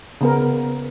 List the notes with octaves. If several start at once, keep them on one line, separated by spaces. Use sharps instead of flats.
C#3 B3 A#4